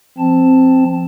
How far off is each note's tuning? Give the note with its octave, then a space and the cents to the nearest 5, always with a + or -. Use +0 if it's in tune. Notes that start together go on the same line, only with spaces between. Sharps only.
F3 -15 C4 +0 A5 +0